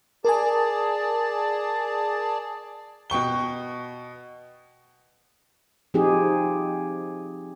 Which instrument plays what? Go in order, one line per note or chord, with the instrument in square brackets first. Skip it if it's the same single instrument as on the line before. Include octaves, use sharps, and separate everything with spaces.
[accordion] G#4 D5 A5 [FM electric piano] A#4 G#5
[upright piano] B2 G5 C#6 G7
[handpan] F3 C4 D#4 G4 G#4